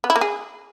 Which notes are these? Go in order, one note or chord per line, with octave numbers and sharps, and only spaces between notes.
B3
E4
A#3
G#4